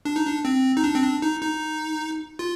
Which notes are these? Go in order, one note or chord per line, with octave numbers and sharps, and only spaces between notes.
D4
D#4
D4
C4
D#4
D4
C4
D4
D#4
D#4
F4